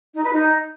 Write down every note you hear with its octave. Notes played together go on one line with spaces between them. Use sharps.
D#4
B4
D#4